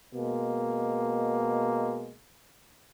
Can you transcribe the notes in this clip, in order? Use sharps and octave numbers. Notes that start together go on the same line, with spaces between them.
B2 G#3 A#3